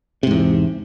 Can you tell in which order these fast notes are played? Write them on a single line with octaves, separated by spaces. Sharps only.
C3 G#2 E2